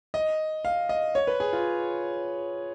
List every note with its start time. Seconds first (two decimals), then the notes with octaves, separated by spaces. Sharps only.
0.14 D#5
0.65 F5
0.89 D#5
1.15 C#5
1.27 B4
1.40 G#4
1.53 F4